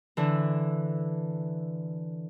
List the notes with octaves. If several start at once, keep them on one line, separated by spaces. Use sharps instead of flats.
D3 E3